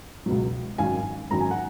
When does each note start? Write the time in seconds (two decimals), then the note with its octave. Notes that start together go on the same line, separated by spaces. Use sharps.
0.26 C#2 B2 F#3
0.78 G#1 F#2 D#3 F5 G#5
1.30 G#1 F#2 D#3 A#5
1.41 G#5
1.51 F#5